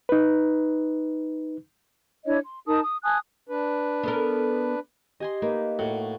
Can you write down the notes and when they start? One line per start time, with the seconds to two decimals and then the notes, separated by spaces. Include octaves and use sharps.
0.09 D#4 B4
2.25 D4 E4 C#5 D#5
2.45 C6
2.67 D#4 A#4 A5 D#6
2.82 D#6
3.04 G#5 A5 D#6 F#6
3.49 D4 B4
4.03 B3 A4 A#4
5.20 G4 D#5 G#5 C6
5.42 A#3 D#4 B4
5.79 A2 F#4